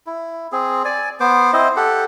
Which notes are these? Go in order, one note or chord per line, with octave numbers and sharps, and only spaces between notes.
E4
C4 G#4
D5 G#5
B3 C5 D6
C4 E4 C5 D#5
G4 A4 F#5